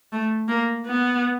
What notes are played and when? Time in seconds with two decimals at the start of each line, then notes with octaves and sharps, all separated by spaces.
0.12 A3
0.49 A#3
0.86 B3